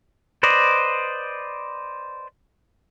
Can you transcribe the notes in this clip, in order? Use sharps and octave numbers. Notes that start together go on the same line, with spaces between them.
B4 C5 D5 D#5